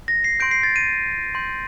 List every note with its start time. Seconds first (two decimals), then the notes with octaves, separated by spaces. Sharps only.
0.08 A#6
0.24 C7
0.40 C6 G6 D7
0.51 C7
0.63 A6
0.76 D#7
1.35 C6 G6